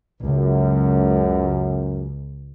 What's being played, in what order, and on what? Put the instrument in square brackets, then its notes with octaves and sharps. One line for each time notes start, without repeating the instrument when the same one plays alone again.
[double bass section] C#2 [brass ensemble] F#2